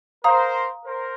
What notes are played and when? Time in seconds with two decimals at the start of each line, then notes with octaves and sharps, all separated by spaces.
0.24 A#4 C5 F5 A#5 D#6
0.85 A#4 C5